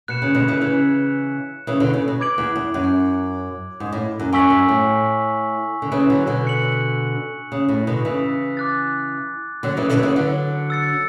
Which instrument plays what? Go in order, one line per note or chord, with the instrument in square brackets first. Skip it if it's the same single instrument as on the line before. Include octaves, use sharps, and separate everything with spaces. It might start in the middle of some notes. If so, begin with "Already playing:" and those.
[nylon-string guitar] B2 [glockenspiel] F#6 C#7 E7
[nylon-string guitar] C#3
B2 D3
C#3 E3
C#3 E3
C#3 E3
B2 D3
C#3
B2
[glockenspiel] D6 G#6 D7 F#7
[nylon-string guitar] E2
E2
F#2
G#2
A2
F#2
[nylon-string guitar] F#2 [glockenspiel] G#5 C#6 E6 B6 F#7
[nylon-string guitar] F#2
A2
D3
C#3 E3
D3 F#3
B2 D3
[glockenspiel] F#6 C#7 F#7
[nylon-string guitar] C#3
A2
B2 D3
C#3 E3
[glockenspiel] D6 F#6 A6
[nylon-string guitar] D3 F#3
C#3 E3
B2 D3
F#3
C#3 E3
D3 F#3
[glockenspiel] E6 A6 C#7